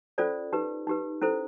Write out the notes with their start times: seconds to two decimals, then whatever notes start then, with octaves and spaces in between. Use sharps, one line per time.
0.18 C#4 F4 A4 C5 D5
0.53 D#4 G4 B4
0.87 D#4 G4 B4
1.21 C#4 E4 A4 C5